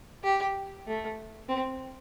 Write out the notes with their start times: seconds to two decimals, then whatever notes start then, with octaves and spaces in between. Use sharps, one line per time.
0.24 G4
0.87 A3
1.48 C4